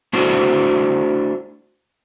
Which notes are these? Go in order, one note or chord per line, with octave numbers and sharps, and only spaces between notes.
A3 D4 E4 F#4 C5 D5